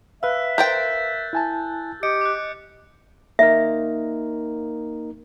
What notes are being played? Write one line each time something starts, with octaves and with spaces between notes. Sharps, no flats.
B4 E5 F5 E6 F#6
A#4 C5 G5 G6 A6
E4 G#5 A5
G4 D#5 G6 C#7 D7
D6 F#6
A#3 D#4 A#4 E5